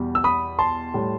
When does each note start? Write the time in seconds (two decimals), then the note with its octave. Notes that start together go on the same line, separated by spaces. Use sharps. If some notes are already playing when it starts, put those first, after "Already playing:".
Already playing: E2 B2 G3
0.15 E6
0.24 B5 D#6
0.59 A5 C6
0.94 A2 G3